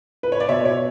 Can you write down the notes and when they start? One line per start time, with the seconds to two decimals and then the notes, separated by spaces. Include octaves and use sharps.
0.23 B4
0.32 C#5
0.40 D5
0.49 B2 C#5 E5
0.65 C#5